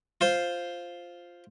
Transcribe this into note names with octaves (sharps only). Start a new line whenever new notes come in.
F4 C5